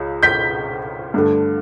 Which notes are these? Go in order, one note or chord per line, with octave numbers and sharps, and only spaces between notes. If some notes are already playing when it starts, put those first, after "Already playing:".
Already playing: C#2 C#3
G6 B6
G2 D3 A3